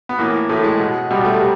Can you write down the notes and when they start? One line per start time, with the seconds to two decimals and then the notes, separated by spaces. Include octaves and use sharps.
0.09 B3
0.19 A2 E3 A#3
0.49 A2 E3 A3
0.64 G#3
0.80 B2
1.11 B2 G3
1.25 A3
1.40 C3 G3